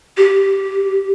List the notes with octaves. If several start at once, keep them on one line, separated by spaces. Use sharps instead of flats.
G4